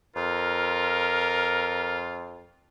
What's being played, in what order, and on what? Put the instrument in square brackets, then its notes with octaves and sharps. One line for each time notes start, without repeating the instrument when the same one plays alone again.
[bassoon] F2 [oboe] F4 [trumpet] A#4